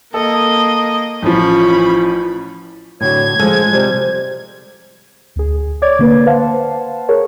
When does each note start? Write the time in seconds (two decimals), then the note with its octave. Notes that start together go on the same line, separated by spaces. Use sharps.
0.14 A#3 A4 D#5
1.22 A1 F3 C#4 B5
3.01 A2 D3 F#4 C#5 G#6
3.39 F3 G#3 G#4 A4 C5
3.73 C3 G3 C5
5.36 D2 G#4
5.82 C#5 D5 D6 G#6 A6
5.99 D3 A#3 B4
6.26 B4 C5 F5 F#5 A5
7.09 G#4 A#4 C#5